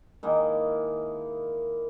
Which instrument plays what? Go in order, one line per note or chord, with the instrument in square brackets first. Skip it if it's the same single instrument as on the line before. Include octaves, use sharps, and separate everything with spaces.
[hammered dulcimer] D#3 G#3 A#3 E4